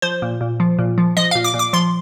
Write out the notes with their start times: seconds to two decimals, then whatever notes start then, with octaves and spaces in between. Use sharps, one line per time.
0.02 F3 C5
0.22 A#2
0.41 A#2
0.60 F3
0.79 A#2
0.98 F3
1.17 F3 D#5
1.31 A#2 F5
1.44 D6
1.54 A#2
1.59 D6
1.73 F3 C6